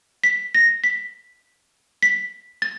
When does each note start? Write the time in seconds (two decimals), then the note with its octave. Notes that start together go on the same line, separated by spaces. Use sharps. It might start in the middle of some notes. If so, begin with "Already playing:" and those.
0.24 B6
0.54 A#6
0.84 B6
2.03 B6
2.62 A6